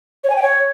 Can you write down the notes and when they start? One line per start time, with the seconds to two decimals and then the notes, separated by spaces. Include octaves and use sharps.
0.24 C#5
0.30 G#5
0.36 G5
0.42 C#5